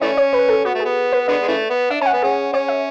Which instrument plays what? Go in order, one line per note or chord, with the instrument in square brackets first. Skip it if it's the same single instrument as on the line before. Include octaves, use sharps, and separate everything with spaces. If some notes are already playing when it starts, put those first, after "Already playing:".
[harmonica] E3 A3 C#4 [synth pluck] D5
[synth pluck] C#5
B4
A4
[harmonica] B3 [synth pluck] F#4
[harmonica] A3
[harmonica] B3 [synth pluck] G#4
[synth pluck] B4
[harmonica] D3 G#3 B3 [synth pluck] D5
[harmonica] G#3
C#3 E3 A3
B3
[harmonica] D4 [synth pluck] E5
[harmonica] C#4 [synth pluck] G#5
[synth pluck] F#5
[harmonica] B3
[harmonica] C#4 [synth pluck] G#4
[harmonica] C#4 [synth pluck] C#5
[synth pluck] E5